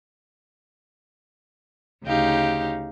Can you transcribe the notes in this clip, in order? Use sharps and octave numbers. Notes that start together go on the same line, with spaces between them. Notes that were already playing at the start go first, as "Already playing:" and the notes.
D2 C#3 D#4 G4 F5